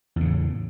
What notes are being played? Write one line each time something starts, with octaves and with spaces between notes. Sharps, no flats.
E2 A2 C#3